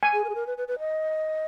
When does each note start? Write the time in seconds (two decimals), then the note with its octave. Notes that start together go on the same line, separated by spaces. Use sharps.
0.03 G#5
0.13 G#4
0.24 A#4
0.29 G#4
0.35 A#4
0.47 B4
0.58 B4
0.68 B4
0.79 D#5